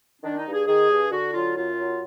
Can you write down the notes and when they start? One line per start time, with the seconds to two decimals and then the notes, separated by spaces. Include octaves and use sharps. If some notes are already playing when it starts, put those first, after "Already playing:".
0.22 D#3 D4
0.38 D#4
0.46 G2
0.53 G#4
0.67 D#3 G#4
0.89 G2
1.12 D3 F#4
1.34 F#3 F4
1.56 F#2 F4
1.78 F#3